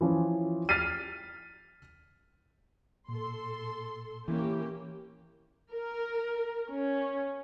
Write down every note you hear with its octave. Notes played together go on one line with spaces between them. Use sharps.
E3 F3 C#4
F6 A6 B6 C7 D#7
A#2 A4 C6
E3 A#3 C#4 G4
A#4
C#4